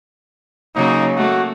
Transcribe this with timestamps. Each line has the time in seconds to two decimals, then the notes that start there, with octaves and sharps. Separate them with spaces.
0.75 C#3 F#3 A#3 D#4
1.17 A3 A#3 F#4